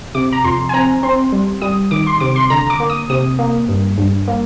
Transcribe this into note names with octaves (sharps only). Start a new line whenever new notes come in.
C3 D6
A#5
F2 C6
G#5
C4 A#5
C4 C6
G3
G3 D#6
D#3 D6
C6
C3 D6
C6
D3 A#5
D6
A#3
D#6
C3 D#6
A#3
G2
G2
A#3